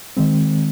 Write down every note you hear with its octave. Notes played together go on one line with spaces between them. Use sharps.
D#3 G#3 C4